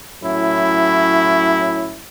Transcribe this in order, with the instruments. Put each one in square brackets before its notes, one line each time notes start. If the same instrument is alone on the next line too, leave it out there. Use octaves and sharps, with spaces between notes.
[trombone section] A2 F#3 C#4 E4